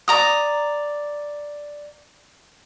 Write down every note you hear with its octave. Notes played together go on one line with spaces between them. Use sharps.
D5 A#5 D#6